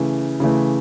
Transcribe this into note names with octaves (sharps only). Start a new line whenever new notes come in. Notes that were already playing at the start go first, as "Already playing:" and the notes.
Already playing: C#3 E3 A3
C#3 E3 A3